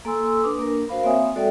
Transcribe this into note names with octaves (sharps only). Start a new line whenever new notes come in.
A#3 A4 G#5 C6 E6
D4 B4 D6 D#6
A#3 D4 A#4
F#4 A#4 C5 F5 B5
A#3 C4 C#5 E5 G#5 D#6
G#3 F#4 A4 D5 E5 G5